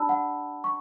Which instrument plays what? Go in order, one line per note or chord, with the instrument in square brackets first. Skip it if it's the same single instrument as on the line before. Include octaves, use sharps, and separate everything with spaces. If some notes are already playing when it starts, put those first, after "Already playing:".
Already playing: [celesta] D4 G4 D5 A5 B5 E6
F#5
C#6